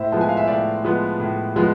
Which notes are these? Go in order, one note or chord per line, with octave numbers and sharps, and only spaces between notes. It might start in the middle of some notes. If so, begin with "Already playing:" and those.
Already playing: A2 C5 E5
F3 G#3 B3 A5
G#5
F5
E5 G#5
A2 D5 F5
F3 G#3 B3
A2
F3 G#3 B3